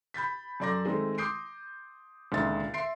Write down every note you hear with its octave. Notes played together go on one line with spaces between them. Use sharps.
B5 G6 A6 B6
F#2 A4 D5 C6 D6 A#6
D#3 G#3 A3 C4 D#4
C6 D6 D#6 G6 C7 D7
C#2 A#2 D3 D#3 E5 A6
E5 C6 C7 D7